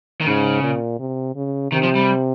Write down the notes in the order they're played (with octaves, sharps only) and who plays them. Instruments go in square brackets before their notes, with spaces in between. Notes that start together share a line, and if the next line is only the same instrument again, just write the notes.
[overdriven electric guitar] D#3
[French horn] G#2 [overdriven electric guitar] C#3
[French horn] A#2
C3
C#3
[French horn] C3 [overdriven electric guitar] D#3
[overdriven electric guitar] F3
G3